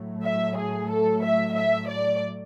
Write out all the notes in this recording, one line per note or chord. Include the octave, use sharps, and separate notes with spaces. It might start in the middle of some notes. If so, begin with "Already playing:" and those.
Already playing: A2 F#3 A3
E5
G#4
A4
E5
E5
D5